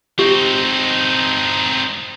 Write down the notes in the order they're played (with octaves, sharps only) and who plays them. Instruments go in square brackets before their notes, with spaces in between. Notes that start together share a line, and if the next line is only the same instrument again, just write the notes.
[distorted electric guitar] C4 D#4 [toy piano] G4